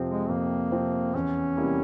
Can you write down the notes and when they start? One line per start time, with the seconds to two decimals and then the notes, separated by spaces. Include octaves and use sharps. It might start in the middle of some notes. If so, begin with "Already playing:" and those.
Already playing: F2 C3 F3 C4
0.08 G#3
0.29 F2 A#3
0.72 C3 F3 C4
1.15 E2 C#4
1.57 C3 G3 A#3 E4